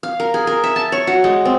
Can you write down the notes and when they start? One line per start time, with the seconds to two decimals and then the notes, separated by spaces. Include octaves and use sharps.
0.03 F5
0.20 A#4
0.34 G#4
0.47 A#4
0.64 E5
0.76 A5
0.92 C#5
1.07 F#4
1.24 G#3
1.45 C4